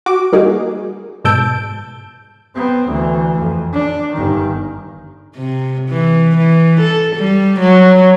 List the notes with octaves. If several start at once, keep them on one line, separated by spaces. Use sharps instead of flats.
F#4 D6
G3 A3 A#3 D#4 F#4 G#4
G#2 B2 A5 E6 G6 D7
B3 C4
D2 E3
F2
D4
G1 D#3
C3
E3
E3
A4
G3
F#3